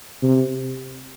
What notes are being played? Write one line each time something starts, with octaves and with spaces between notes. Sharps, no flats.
C3